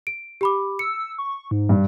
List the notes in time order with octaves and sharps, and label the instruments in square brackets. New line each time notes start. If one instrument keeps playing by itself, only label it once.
[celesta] D7
G4 B5 D6
[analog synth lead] E6 [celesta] C#7
[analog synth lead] C#6
G#2
[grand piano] G2